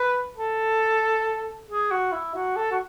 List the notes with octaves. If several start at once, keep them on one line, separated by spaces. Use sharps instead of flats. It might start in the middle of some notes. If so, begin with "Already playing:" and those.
Already playing: B4
A4
G#4
F#4
E4
F#4
A4
F#4